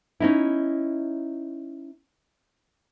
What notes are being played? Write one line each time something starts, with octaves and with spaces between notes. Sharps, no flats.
C#4 D#4 E4